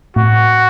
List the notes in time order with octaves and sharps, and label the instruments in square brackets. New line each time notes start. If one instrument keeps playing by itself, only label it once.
[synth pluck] A2 [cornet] F#4